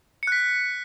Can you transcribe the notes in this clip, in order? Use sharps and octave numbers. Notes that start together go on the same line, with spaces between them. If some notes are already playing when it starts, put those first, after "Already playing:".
F#6 B6 C#7